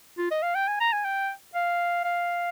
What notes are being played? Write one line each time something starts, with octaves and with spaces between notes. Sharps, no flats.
F4
D#5
F5
G5
G#5
A#5
G#5
G5
F5
F5